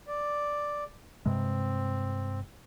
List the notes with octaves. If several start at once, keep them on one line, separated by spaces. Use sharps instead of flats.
D5
G2 C3 G#3 C4